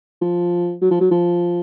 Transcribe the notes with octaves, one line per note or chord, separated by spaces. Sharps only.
F3
F#3
F3
F#3
F3